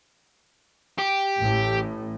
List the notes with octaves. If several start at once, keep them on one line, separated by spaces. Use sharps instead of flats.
G4
A1 A2